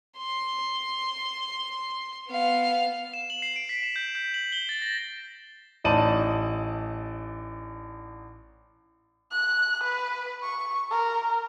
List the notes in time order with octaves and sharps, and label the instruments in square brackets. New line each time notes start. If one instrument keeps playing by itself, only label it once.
[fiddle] C6
B3 F5
[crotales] E7
F#7
C7
D7
B6
E7
G6
G6
F#7
G7
A6
A#6
[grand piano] A1 D#4 D5 A5 D#7 F#7
[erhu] F#6
B4
C#6
A#4